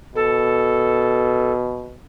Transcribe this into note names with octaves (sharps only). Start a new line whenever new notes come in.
B2 A4